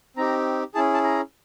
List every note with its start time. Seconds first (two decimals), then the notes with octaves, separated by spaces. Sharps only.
0.17 C4 D#4 G4 A#5
0.75 C#4 E4 G#4 A5
0.94 A5
1.04 A#5